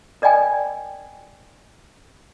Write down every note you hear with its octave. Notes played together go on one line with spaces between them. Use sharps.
A#4 D5 D#5 G5 G#5